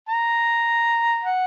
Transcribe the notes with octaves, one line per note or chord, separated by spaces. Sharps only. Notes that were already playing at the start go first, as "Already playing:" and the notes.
A#5
F#5